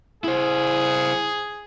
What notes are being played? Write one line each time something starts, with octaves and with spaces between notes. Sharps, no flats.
E4 G#4 C5